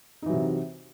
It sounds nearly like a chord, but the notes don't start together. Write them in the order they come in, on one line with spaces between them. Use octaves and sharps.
D#4 E3 F#3 C3